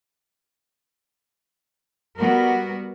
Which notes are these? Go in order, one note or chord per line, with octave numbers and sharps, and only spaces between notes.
G3 B3 F#4 A#4